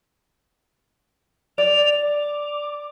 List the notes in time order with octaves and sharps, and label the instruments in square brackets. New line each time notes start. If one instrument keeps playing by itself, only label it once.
[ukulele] D5 [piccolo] F7
[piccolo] D6